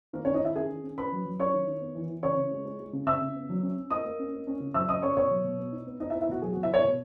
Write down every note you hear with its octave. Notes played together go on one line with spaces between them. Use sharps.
D#3 A#3 A#4
C#4 C#5
D#3
D#4 D#5
D#3 E4 E5
C#4 G#4 G#5
D#3
C#4
C#4 B4 B5
F#3
F#3
C#4 C#5 C#6
D#3
D#3
B3
E3
E3
C#3 C#5 C#6
C#3
G#3
G#3
G#3
C#3
C#3 E5 E6
C#3
B3
F#3
C#4
C#4
A#3 D#5 D#6
A#3
C#4
A#3
C#4
C#3
F#3 E5 E6
C#3 D#5 D#6
C#4 C#5 C#6
B2 C#5 C#6
F#3
B2
B3
D#4
B3
D#4 D#5
E4 E5
B3
E4 E5
B2 F#4
F#3 G#4
F#4
B2
E4 E5
B2 C#5 C#6
B2